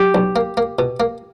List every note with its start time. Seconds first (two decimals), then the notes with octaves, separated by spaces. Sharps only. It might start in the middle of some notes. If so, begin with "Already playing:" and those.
Already playing: F#3 G4
0.15 B1
0.36 A#3
0.57 A#3
0.79 B2
1.00 A#3